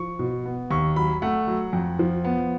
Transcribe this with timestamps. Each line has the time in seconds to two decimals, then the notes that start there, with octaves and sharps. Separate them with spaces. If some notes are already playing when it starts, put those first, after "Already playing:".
Already playing: F3 C#6
0.19 B2
0.46 B3
0.70 D#2 C#6
0.96 F#3 B5
1.22 A3 F#5
1.47 F#3
1.73 F2
1.99 F3
2.24 B3